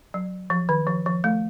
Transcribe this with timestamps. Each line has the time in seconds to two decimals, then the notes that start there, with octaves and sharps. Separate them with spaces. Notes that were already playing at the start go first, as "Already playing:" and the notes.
0.14 F#3
0.50 F3
0.69 D#3
0.87 F3
1.06 F3
1.24 A3